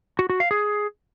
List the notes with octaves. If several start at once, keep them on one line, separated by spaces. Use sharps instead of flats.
F#4
F#4
F5
G#4